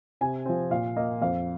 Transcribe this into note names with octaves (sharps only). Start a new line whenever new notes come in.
C3 G#5
F3 C4
A#2 F5
A#3 D#5
F2 F5